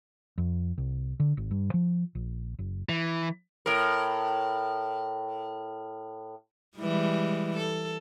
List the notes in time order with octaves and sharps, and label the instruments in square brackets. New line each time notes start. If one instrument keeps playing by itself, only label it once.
[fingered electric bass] F2
C2
D3
G#1
G2
F3
A#1
F#1
[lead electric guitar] E3
[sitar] A2 A#4
[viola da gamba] E3 G3 G#3
A4